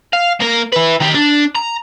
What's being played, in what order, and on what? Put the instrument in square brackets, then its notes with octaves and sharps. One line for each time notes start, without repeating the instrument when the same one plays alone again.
[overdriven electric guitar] F5
A#3 A#4
E4 B4
D#3 G4
D4
A#5